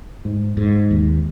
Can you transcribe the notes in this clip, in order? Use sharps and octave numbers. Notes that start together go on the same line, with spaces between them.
G#2
G#2
D#2